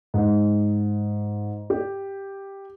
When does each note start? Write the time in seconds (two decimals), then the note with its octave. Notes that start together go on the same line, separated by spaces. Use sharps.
0.14 G#2
1.70 G4